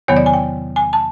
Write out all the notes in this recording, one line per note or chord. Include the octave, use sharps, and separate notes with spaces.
E2 C3 D#3 F#3 B3 C#5
D5
G#5
G5
G#5
A5